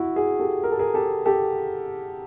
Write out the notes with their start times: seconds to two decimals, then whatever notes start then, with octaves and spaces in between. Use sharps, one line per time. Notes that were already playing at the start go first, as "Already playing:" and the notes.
Already playing: E4 F#4
0.16 F#4 G#4
0.39 G4 A4
0.63 A#4
0.72 A4
0.79 G#4 A#4
0.94 G4 A4
1.26 G4 A4